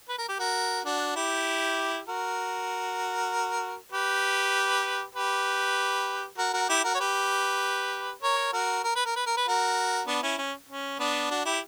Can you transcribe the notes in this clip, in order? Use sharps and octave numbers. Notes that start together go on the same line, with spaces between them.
B4
A#4
G4
F#4 A#4
D4 F#4
E4 G4
F#4 A#4
G4 B4
G4 B4
F#4 A#4
F#4 A#4
E4 G4
F#4 A#4
C#5
G4 B4
A#4 C#5
F#4 A#4
A#4
B4
A#4
B4
A#4
B4
F#4 A#4
B3 D4
C#4 E4
C#4
C#4
B3 D4
D4 F#4
E4 G4